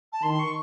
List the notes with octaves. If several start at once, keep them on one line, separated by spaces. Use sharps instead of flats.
A5
D#3 C6
C#6